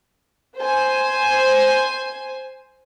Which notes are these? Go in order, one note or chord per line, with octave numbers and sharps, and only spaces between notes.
C5 G#5